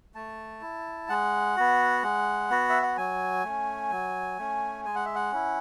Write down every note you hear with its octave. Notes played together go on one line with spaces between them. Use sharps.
A3 A5
E4
G#3 F#5
B3 F#4
G#3
B3 F#4
E5
F#5
F#3 G#5
A3 C#4
F#3
A3 C#4
G#3 G#5
F#5
E5
F#5
C#4 E4